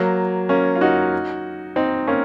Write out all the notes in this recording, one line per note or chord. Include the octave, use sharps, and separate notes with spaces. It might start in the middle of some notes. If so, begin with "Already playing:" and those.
Already playing: F#3 A#3
A#3 C#4
F4
D#4 F#4
C4 D#4
A#3 C#4